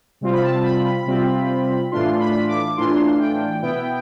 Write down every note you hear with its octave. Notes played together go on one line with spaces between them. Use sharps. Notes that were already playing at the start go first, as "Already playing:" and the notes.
C3 G3 C4 F4
B5
A5
B5
B5
C3 G3 C4 F4
A2 E3 A3 D4 F4 C6
B5
D6
A2 E3 A3 D4 F4 C6
G5
B2 B3 E4 G5